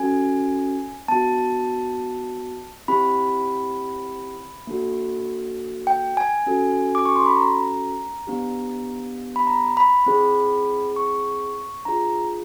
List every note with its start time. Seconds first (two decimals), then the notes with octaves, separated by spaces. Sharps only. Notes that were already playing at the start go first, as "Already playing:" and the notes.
Already playing: C#4 F#4 A4 G#5
1.08 B3 D4 F#4 A5
2.88 C4 E4 G4 B5
4.67 A#3 D4 F#4 A4
5.87 G5
6.17 G#5
6.46 C#4 F#4 A4
6.95 D6
7.05 C#6
7.16 C6
7.26 B5
7.37 A#5
8.27 B3 D4 G4
9.36 B5
9.47 A#5
9.77 B5
10.06 C4 E4 G#4
10.96 C#6
11.85 D4 F4 G#4 A#5